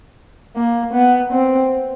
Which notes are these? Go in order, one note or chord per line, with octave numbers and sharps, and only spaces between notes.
A#3
B3
C4